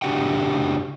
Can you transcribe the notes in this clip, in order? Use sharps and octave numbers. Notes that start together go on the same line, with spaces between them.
C#3 D4 F#4 G4 F#5 G5